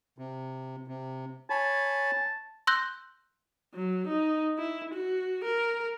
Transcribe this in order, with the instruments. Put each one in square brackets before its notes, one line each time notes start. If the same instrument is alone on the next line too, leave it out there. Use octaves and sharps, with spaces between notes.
[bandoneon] C3
C3
[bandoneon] C#5 G#5 B5 [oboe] A5
[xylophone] C6 E6 F#6 G6 A#6 G7
[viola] F#3
D#4
E4
F#4
A#4